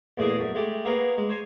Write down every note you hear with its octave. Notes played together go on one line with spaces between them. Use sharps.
E2 A#2 A3 G#4 D#5 G#5
F#2
G#3 A3 G4
A#3 B3 G#4 A#4 C#5
G#3
C5 C#5 G#5